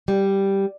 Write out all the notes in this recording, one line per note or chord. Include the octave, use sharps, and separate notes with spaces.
G3